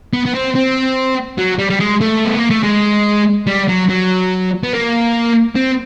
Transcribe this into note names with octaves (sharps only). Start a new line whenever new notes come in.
B3
B3
C4
C4
F#3
G3
G3
G#3
A3
B3
A#3
A3
G#3
G3
F#3
F#3
B3
A#3
C4